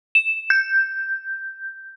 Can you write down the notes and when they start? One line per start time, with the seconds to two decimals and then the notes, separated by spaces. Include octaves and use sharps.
0.15 E7
0.50 G6